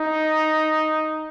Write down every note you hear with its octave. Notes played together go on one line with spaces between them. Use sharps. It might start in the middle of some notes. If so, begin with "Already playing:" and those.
Already playing: D#4